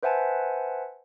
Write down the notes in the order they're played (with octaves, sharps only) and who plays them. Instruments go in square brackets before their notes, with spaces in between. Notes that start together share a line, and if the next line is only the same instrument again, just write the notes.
[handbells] B4 C5 E5 F#5 G#5 A5